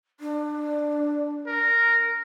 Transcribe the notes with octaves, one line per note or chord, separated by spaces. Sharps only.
D4
A#4